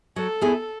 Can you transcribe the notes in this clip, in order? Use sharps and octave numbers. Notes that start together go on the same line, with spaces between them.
F#3 A4
B3 E4 G#4